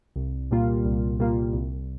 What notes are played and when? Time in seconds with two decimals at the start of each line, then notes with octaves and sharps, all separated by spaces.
0.16 C2
0.51 A#2 G3 A#3 F4
0.85 C2
1.19 A#2 G3 A#3 F4
1.53 C2